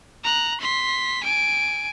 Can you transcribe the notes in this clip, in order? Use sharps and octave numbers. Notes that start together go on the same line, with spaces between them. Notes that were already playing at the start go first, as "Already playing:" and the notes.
A#5 F#6
C6 B6
G#5 D7